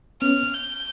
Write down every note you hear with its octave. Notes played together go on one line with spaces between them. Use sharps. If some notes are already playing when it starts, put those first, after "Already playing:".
B3 C#4 F6
G6